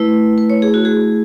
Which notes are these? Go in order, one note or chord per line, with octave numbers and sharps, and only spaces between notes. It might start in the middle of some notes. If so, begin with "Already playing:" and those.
Already playing: A3 E4 B4
B4
C#5
G#4
F#4
G#4